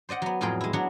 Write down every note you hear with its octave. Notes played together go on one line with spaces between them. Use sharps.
C5 D5 D#5 F#5
F#3 B3
F2 A2 F#3 F4 G#4 G5
G#3 E4
F#3 B3 D4 F#4 C#5